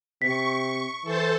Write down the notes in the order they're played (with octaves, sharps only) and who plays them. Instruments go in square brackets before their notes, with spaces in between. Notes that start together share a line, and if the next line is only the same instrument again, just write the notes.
[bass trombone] C3 [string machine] C#6 [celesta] B6
[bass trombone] E3 [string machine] A4 C5 A5